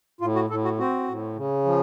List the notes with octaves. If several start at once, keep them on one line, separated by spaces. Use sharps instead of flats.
A2 F4
F#4
A2 A4
F#4
C4 F#4
A2
C#3
F3